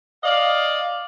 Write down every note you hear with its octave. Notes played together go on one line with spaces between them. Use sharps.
D5 D#5 F5